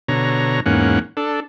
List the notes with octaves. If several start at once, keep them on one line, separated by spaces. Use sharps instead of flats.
B2 D3 C#5 A#5
E2 G#2 A#3 C#4 F#5
D4 A4